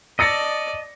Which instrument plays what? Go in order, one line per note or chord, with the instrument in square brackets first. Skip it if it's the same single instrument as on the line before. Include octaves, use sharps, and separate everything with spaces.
[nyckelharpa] D5 [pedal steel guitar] D#5 A5 [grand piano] E6 A#6 C#7